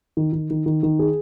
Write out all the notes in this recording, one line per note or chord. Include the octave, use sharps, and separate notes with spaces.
D#3
D#3
D#3
D#3
D#3
G#4